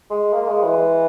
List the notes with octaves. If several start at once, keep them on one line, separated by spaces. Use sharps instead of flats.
G#3
A#3
G#3
E3